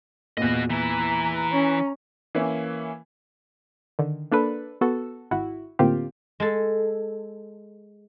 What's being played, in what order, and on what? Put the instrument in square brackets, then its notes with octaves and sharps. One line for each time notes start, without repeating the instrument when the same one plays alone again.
[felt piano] E2 A#2 [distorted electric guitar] F#4 D#5
[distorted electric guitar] E3 E4 [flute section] A#5
[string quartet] C#4
[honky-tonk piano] E3 A#3 C#4 E4
[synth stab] D3 D#3
A#3 D4 A4 B4
B3 F#4 A4
G#1 E4 F#4
A2 D3 A#3 C4 F4 G4
[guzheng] G#3 A4